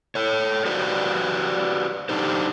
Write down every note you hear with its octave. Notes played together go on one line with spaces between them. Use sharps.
A4 C#5
F#4 G4 B4 C5 D5
D4 D#4 G4 C5